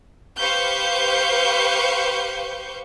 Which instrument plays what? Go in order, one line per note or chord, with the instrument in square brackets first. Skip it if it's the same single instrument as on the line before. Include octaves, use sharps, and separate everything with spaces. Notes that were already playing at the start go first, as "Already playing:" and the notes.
[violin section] G4 B4 C5 F5 C#6 G6